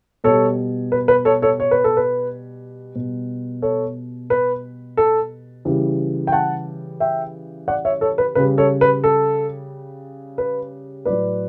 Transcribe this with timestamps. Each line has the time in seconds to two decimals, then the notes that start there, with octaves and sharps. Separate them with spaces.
0.24 B2 G3 A4 C#5
0.92 B4
1.08 B4
1.25 A4 C#5
1.42 A4 C#5
1.60 C#5
1.71 B4
1.84 A4
1.97 B4
2.95 B2 G3
3.62 A4 C#5
4.30 B4
4.97 A4
5.65 C#3 E3 G3
6.27 G5
6.32 F#5 A5
7.00 E5 G5
7.68 D5 F#5
7.85 C#5 E5
8.01 A4 C#5
8.18 B4
8.35 C#3 G3 B4
8.58 A4 C#5
8.81 B4
9.04 A4
10.38 B4
11.05 A2 F#3 B4 D5